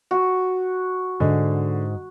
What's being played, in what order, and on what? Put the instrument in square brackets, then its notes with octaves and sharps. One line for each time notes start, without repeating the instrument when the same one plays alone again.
[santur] F#4
[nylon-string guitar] G#2 [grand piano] D3